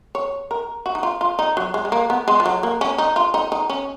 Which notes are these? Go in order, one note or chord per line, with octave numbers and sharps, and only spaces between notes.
C#5
A#4
F#4
D#4
F4
F4
D#4
F#3
G#3
G#3
A#3
B3
G#3
F3
F#3
A#3
C#4
D#4
F4
D#4
D#4
C#4